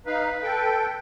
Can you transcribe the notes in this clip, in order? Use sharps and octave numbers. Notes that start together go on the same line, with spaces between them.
D#4 B4 F5
A4 G5